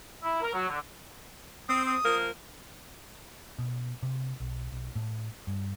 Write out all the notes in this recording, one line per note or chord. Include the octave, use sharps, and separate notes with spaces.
E4
A#4
F#3
D3
C4 D#6
D#6
F3 A#3 A#4
B2
C3
B1
B1
A2
G2